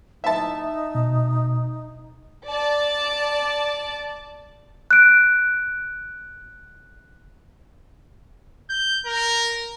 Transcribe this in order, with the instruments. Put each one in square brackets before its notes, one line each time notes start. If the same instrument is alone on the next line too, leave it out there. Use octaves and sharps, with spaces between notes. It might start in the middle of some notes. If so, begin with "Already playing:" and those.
[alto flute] D#4 [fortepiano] E5 A5
[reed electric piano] B2
[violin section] D5 A5
[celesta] F#6 D7
[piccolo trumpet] G6
A#4